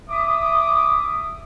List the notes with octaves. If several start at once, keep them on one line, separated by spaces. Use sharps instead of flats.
E5 D6 D#6